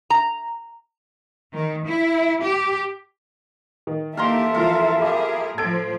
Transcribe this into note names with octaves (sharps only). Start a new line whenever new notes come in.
A#5
D#3
E4
G4
D#3
E3 A#3 G4 A4 E5 F5 A#5 C6
E3 F3 F4 A#4 F5
G4 G#4 A#4 F5 B5 D6
A2 F3 A4 G#6 D7